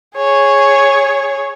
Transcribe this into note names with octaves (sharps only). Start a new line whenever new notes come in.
G#4 C#5